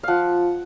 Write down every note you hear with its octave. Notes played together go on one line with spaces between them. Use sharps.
F3 F5 F#5